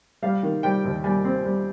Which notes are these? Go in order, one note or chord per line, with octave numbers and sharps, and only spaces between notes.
G3 F5
D#3
G3 G5
D#2
G3 G#5
C4
G3